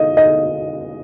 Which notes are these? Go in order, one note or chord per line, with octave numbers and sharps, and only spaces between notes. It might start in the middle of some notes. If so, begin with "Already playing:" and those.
Already playing: D#5
D#5